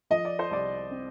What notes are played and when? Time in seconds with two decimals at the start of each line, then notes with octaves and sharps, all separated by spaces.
0.10 F3 D#5
0.25 D5
0.39 C5
0.51 C2 D5
0.91 C4